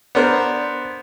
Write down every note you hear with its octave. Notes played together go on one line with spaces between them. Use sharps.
B3 D4 A#4 C5